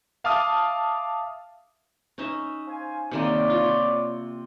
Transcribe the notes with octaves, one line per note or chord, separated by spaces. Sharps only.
E5 F5 A5 D6 D#6 F6
C#4 D#4 E5
C5 F5 G#5
C3 D#3 A#3 C#5 D5
F4